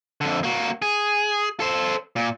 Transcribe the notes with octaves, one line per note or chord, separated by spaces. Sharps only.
F2 D3
A#3 F#4
G#4
A4 C5
A#2